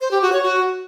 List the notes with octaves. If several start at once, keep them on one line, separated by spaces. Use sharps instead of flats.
C5
G4
F#4
C#5
F#4